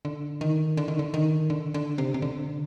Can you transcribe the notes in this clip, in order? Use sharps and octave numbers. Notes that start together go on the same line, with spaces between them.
D3
D#3
D3
D#3
D3
D#3
D3
D3
C3
C3
D3